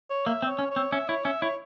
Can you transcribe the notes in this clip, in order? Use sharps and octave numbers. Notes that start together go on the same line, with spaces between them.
C#5
A#3 E5
C4
C#5
C#4
C#5
C4
C#4 E5
E4 C#5
C#4 E5
E4 C#5